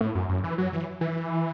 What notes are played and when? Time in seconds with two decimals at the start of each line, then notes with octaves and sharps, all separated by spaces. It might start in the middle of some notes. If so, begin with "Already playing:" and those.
0.01 A2
0.15 F#2
0.29 F#2
0.44 E3
0.58 F#3
0.73 E3
1.01 E3